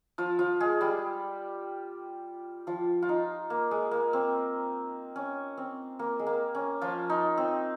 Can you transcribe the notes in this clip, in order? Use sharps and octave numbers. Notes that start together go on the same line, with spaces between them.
F3 F4
F3 F4
G#3 G#4
G3 G4
F3 F4
F4
D#4
A#3
G#3
A#3
C4
C#4
C4
A#3
G#3
A#3
C#4
F3 F4
D#4
C4